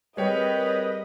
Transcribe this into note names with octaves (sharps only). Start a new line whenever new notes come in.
G3 C4 G#4 A#4 B4 C#5 D#5 G5